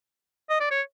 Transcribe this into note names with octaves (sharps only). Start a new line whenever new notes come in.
D#5
D5
C#5